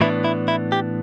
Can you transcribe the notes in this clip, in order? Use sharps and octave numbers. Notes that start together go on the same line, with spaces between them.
A2 E3 B3 D4 E4
E4
E4
G4